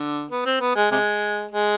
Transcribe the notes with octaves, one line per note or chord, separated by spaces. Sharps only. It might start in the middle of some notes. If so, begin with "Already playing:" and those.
Already playing: D3
B3
C4
B3
G#3
C3 G#3
G#3